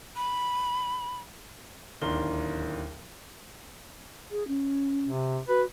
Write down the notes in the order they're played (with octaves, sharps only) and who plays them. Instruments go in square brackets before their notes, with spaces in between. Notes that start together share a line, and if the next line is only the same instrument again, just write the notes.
[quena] B5
[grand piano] D1 D#2 D4 A#4 C6 G7
[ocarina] G#4
C#4
[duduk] C3
[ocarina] F#4 [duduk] B4